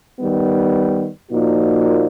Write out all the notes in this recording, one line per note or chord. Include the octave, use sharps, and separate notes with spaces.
D#3 G3 B3
A#2 F3 A#3 D#4 F#4